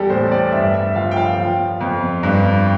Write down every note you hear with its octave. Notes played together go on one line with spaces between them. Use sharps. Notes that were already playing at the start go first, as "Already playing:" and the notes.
Already playing: E2 G3 G4 A4
A2 C5
D5
G2 E5
E5
F3 F5
G5
F5
F3
F2
G2